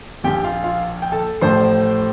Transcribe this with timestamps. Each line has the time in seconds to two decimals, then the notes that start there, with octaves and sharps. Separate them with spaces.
0.24 A#1 A#2 F3 G4 G5
0.44 F4 F5
0.64 F4 F5
1.02 G5
1.12 A4 A5
1.41 A1 A2 F3 C5 C6